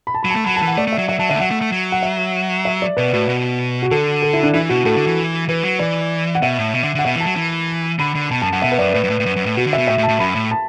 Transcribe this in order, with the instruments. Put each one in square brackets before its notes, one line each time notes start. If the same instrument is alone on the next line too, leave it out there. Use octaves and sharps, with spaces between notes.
[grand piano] B5
A5
[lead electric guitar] F#3 [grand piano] B5
[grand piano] A5
[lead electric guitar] A3
[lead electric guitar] F#3 [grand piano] B5
[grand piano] A5
[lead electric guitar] E3
[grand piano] F#5
[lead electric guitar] A3 [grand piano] D5
[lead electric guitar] A3
[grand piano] E5
[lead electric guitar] F#3
[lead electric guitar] F#3 [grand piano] E5
[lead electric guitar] F#3 [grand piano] A5
[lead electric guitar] D3 [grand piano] E5
[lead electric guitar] A3
[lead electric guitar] F#3 [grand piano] F#5
[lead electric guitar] A3
A3
F#3
[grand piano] F#5
E5
E5
D5
[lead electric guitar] B2 [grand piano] B4
[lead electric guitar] A2 [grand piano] F#4
[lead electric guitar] B2
[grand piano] F#4
[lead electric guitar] D3 [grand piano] A4
[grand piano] A4
E4
D4
[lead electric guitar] E3 [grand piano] E4
[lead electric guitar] B2 [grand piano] F#4
[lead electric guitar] A2 [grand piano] A4
[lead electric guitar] D3
E3
[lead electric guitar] E3 [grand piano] B4
[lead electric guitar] F#3
[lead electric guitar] E3 [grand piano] D5
[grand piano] F#5
[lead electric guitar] B2 [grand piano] E5
[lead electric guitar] A2
B2
D3
[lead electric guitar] D3 [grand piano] F#5
[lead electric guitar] B2 [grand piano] E5
[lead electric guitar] E3
[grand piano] A5
[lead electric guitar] F#3
E3
[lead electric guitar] D3 [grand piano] B5
[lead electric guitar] D3
[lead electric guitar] B2 [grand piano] A5
[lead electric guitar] F#2 [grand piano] A5
[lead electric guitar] F#2 [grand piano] F#5
[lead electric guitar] B2 [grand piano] E5
[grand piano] B4
[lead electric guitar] F#2 [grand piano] D5
[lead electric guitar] A2 [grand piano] B4
[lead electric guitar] F#2
A2
A2
F#2
F#2
A2
[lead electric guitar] B2 [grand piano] F#4
[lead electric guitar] D3
[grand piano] E5
[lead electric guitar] B2
[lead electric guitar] A2 [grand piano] E5
[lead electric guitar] A2
[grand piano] A5
[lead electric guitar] A2
[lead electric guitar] F#2 [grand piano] B5
[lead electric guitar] A2
[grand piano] A5